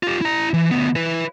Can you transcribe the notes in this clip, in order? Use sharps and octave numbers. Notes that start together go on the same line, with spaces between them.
F4 G4
E4 A#5
E3
D2 B3
E4 B4